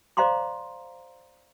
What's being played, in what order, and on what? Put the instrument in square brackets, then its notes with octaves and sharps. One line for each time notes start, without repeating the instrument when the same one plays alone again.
[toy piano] C5 D5 F5 A#5 C6 D6